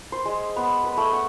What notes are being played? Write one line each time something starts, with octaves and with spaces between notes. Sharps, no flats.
C5
G#3
B3
B4
A3
F#5